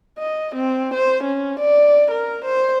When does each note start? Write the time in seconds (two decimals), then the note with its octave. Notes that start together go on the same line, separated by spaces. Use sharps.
0.18 D#5
0.55 C4
0.94 C5
1.24 C#4
1.59 D5
2.11 A#4
2.45 C5